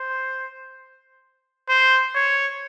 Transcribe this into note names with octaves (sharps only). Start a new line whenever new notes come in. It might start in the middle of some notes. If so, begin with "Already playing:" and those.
Already playing: C5
C5
C#5